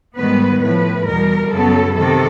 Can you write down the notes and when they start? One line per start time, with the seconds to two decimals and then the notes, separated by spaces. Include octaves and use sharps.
0.17 G#2 D#3 G3 B3 B4
0.61 A2 F3 A3 B4
1.06 E2 B2 G3 A#4
1.51 F#2 C#3 F#3 B3 A4
1.95 C3 D#3 A4